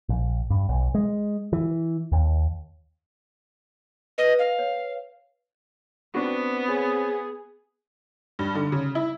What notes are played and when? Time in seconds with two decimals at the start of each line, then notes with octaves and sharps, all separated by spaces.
0.09 A#1
0.50 G2
0.69 B1
0.95 G#3
1.53 E3
2.12 D#2
4.18 B4 D#5
4.39 F5
4.59 C#5
6.14 B3 C4 D4 F#4
6.69 G#4 C#5
8.39 G2
8.55 D3
8.72 C#3
8.95 E4